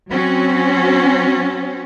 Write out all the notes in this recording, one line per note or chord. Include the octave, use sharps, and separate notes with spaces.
F#3 C4 C#4 F#4